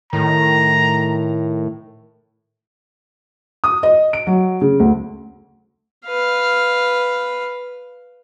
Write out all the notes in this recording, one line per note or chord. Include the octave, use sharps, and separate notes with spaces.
A2 D#3 A#5
D#6
D#5
D7
F#3
C#3
D2
B4 F5